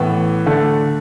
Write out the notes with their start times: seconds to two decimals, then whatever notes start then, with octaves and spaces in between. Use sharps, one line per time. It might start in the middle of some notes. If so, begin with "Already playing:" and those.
Already playing: A2 E3 B3
0.46 D3 A3